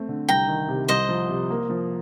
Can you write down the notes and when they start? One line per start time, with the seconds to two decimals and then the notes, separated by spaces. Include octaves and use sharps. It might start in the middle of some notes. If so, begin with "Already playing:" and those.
Already playing: A3 C4
0.08 D3
0.29 C2 G5 A#5
0.48 D#3
0.68 C3
0.88 C2 C5 D#5
1.09 F3
1.30 C3
1.50 A#3
1.70 F3